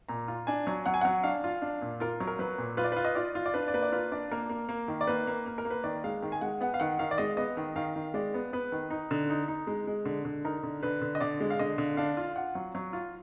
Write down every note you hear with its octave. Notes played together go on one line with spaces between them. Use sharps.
A#2 A#5
F4
D4 G#5
F#3
F#3 F#5
G#5
F#3 F#5
D4 F5
F4
D4
A#2
F4 A#4
F#3
A#4
F#3 B4
A#2
F4 B4
D5
F4 B4
D#5
F4 D5
F4
D5
D4 B4
D5
A#3 B4
D5
F4 B4
D4 D5
A#3 A#4
A#3
A#3
D#3
D5
A#3 B4
A#3
A#3
A#4
A#3
B4
D#3 D5
G#3 F5
D#3
G#5
G#3 F#5
B3 F#5
F5
D#3 F#5
D#3 F5
D5
G#3 D#5
B3 D#5
D#3
D#3 F5
D#3
G#3 D5
B3
B3 B4
D#3
D#4
D3
D#4
D#4
G#3
G#3
D3
D3
D#4 A#4
D3
D3 B4
D3
D#5
D3 D5
G#3
F5
D3 D#5
D3
D4 F5
F4
F4 F#5
F#3
F#3
F4